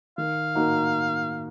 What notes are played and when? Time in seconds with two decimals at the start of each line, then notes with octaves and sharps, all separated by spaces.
0.18 D#3 F5
0.55 A#3 D#4 F#4